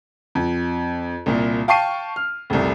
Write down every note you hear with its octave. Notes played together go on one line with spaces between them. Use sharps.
F2
C2 A#2
F5 G5 A5 C#6 C7 D#7
F6
F1 C2